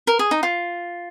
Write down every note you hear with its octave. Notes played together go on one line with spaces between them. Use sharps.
A#4
G#4
D#4
F4